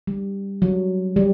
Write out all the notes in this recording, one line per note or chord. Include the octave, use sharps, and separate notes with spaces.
G3
F#3
G3